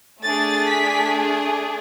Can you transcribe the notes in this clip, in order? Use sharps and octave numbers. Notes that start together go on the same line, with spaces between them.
A3 D4 G#4 A6
B6